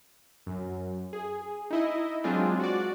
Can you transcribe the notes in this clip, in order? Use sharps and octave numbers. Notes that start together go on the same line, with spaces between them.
F#2
G#4
D#4 E4 D#5
F#3 G#3 C4 D4 F4 G#4
F#4 D5